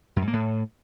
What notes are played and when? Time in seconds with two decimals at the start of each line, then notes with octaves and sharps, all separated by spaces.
0.16 F#2
0.22 G#2
0.28 A#3
0.33 A2